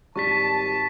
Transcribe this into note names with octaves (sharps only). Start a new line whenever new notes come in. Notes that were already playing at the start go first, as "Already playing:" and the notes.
G#1 G3 A5 C#6 A6 B6